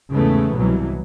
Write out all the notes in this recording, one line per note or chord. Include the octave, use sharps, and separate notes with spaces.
E2 G#2 C#3 E3 A3 B3
C2 B2 E3 F#3